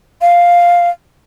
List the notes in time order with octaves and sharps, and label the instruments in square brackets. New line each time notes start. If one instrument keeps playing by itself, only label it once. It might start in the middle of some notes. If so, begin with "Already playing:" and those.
[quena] F5